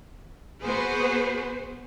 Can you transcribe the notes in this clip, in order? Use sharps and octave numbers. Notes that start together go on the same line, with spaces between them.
B3 F#4 G#4 B4 C5